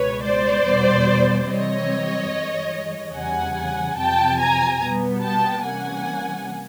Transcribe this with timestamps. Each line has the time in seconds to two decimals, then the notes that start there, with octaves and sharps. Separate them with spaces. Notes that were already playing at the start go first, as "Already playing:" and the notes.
Already playing: C#2 B2 G#3 B4 C#5
0.23 C5 D5
0.64 E2 B2 G3 B3
1.48 C3 E3 G3 C4 C#5 D#5
2.31 G2 E3 G#3
3.14 E2 C#3 E3 G3 F#5 G#5
3.97 F2 C3 F3 G5 A5
4.39 G#5 A#5
4.81 B2 G3 B3
5.23 G5 A5
5.64 C3 E3 G3 A#3 C#4 F#5 G#5